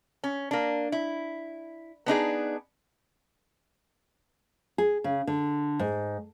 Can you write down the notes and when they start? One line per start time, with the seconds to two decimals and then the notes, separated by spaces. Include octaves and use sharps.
0.24 C#4
0.51 A#3 D4
0.92 E4
2.06 B3 D4 D#4 G#4
4.78 G#4
5.04 C#3
5.27 D3
5.79 G#2